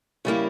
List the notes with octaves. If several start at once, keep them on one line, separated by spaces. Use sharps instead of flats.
C#3 G3 A#3 E4